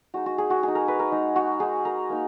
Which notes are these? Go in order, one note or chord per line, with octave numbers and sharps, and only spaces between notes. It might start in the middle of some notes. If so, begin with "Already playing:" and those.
G#3 D#4 F#4
F#4
G#4
F#4
G#3 D#4 G#4
A#4
B4
A#4
G#3 D#4
F#4
G#3 D#4 G#4
A#4
A#3 D#4